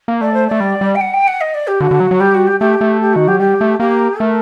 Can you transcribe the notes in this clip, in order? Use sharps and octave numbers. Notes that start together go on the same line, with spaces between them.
A#3
A3 D5
C5
A3 D5
G3
G3
G5
F#5
G5
F#5
D#5
D5
G4
D3 F#4
D3
F#3
F#3
G3 G4
F#4
G4
A3 G4
A3
G4
D#3 F#4
F#3 G4
G3 G4
A3
A#3 G4
A3 A#4